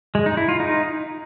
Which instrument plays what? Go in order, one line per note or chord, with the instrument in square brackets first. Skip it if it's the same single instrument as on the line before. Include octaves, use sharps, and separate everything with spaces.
[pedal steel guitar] G#3
D#4
E4
F4
D#4